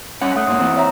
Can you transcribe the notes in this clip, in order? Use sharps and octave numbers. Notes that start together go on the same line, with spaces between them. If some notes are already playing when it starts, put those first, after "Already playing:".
G3 C#4 C#5 F#5
A3 F#5 D#6 F#6
G#2 A#3 D#6
E3 C4
C#5 E5 A#5